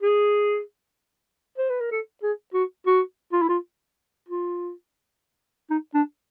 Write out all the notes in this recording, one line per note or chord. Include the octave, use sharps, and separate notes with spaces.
G#4
C5
B4
A#4
A4
G#4
F#4
F#4
F4
E4
F4
F4
D#4
D4